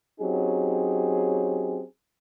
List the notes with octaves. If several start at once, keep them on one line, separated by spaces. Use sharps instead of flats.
F#3 C4 C#4 D#4 G4 G#4